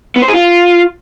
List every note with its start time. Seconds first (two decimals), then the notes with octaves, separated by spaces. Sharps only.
0.16 B3
0.22 C5
0.28 G#4
0.34 F4